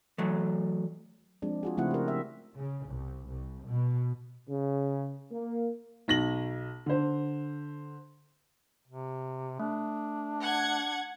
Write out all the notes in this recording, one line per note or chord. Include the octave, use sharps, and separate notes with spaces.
E3 F#3 A3
F3 G#3 C4 D4
F4 F#4 G#4
C#3 F3 A3 C4 E4 F#5
G4 A#4
E5
C#3
C2
C2
B2
C#3
A#3
B1 A#6 F#7
D3 C5
C3
A3 D4
F#5 G#6